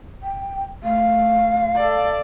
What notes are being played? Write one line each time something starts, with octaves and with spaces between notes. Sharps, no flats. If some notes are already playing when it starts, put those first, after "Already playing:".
G5
A3 F5
A4 D5